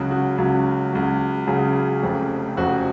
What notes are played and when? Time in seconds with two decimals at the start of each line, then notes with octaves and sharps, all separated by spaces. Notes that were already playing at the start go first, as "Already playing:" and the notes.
Already playing: C#2 C#3 F#3 F#4
0.11 F#4
0.38 C#2 C#3 F#3
0.92 C#2 C#3 F#3
1.47 C#2 C#3 F#3 G#4
2.03 F1 F2 C#3
2.57 F1 F2 C#3 F#4